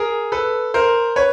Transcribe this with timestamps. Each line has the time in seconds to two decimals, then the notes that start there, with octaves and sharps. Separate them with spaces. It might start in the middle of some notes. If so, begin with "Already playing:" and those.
Already playing: G#4 A#4
0.32 A4 B4
0.74 A#4 C5
1.16 B4 C#5